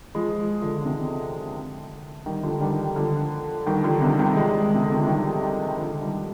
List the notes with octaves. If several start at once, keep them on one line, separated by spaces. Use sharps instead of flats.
F3 G#3
D3 F3
C3 D#3
D#3 G3
D3 F3
D#3 G3
D3 F3
D#3 G3
D3 F3
C3 D#3
D#3 G3
F3 G#3
C3
D3
D#3
F3
D#3 G3
D3 F3
D#3 G3